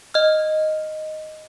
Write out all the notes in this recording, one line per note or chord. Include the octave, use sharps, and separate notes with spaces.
D#5 F6